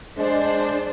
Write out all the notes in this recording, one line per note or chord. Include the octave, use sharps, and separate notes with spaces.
G#3 D4 C5